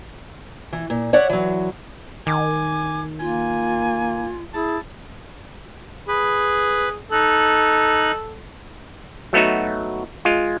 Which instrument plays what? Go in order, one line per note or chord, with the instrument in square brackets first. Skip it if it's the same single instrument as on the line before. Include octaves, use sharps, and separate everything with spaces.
[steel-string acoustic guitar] E3
A#2
C#5 D5 E5 F#5
E3 F#3
[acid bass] D#3 [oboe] G#5 [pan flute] D6
[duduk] A#3 [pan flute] F4 [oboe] G#5
[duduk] E4 [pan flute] G#4 [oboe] A5
[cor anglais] G#4 [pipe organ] B4
[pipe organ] D#4 F#6 [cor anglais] A4
[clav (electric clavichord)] F#3 A3 B3 D#4 F#4
G#3 F4